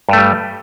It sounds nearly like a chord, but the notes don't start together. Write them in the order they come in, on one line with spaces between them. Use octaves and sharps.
G2 A3 G3